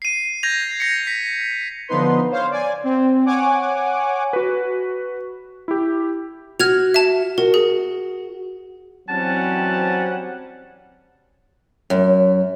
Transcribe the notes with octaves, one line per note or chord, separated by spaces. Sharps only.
C7 D#7
G6 G#6 A#6 F7
A#6 C#7
B6
D3 F3 B3 D#4 B4 C6
C5 C#5 F5
D5 G#5
C4
C#5 F#5 G#5 D6
F#4 B4
E4 G4
F#4 F6 G#6 F7
E5 A5
F#4 A#4
G#4
E3 F#3 G3 C4 C#4 F#5 A5
F#2